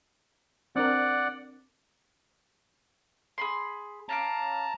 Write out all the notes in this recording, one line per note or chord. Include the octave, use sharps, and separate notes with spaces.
C4 D4 A#4 D5 F#5
G#4 B5 C6
C#4 F5 A5 A#5 D6